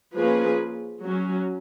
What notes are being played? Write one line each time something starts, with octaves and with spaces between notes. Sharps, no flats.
F3 A#3 C#4 G#4 B4
F#3 C#4